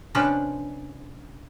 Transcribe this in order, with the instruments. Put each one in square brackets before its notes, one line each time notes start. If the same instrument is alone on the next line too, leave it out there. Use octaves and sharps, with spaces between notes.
[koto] C3 F3 C#4 D4 B4